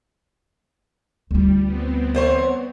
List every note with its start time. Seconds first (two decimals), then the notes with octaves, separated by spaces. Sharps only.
1.31 D2 G3 F4
1.65 B3 C4
2.15 E2 C5 C#5